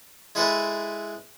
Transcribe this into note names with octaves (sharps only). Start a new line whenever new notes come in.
G#3 E4 G#4 A4 B4 C5